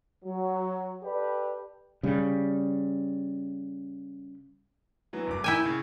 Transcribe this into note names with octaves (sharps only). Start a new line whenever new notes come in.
F#3
G4 A4 B4 D5
C#3 G3
E3 F#3 B3
F#1 G2 D6
D#3 E4 G5 G#5 G6 E7
C#3